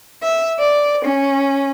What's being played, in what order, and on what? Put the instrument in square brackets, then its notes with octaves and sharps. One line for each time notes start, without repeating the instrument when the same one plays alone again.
[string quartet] E5
D5
C#4